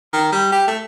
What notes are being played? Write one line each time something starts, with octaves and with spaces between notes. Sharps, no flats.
D#3
G3
G4
A3